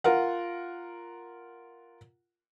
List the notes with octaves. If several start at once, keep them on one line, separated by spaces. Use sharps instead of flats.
F4 A#4 F#5